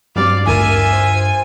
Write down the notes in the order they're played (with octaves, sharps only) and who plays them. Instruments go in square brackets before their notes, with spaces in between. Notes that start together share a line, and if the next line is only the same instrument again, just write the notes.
[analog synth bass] G2 [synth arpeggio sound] F#3 G3 C4 [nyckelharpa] D5 F5
[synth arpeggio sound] A1 D2 A#4 [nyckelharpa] F4 E5 [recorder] G#5
[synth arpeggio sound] C5